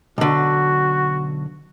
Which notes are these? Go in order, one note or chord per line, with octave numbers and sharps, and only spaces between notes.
B1 D3 F#4